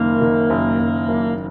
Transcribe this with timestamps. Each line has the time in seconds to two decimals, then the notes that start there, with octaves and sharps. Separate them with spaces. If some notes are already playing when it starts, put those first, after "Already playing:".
Already playing: F#1 D#3 A#3
0.21 D#3
0.50 F#1
0.79 F#1
1.08 F#1